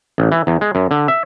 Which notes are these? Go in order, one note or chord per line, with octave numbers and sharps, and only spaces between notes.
A1
E3
E2
G#3
F#2
D3
E5